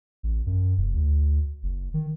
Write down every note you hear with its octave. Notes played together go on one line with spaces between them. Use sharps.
A1
F#2
F1
D2
F#1
D#3